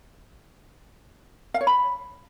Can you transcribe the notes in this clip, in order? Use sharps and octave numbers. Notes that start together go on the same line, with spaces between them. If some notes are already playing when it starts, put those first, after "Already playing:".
F5
C#5
B5